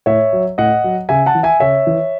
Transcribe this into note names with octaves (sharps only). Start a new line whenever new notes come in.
A2 C#5 E5
F#3
A2 D#5 F#5
F#3
C#3 E5 G#5
F#5 A5
E3
E5 G#5
C#3 C#5 E5
E3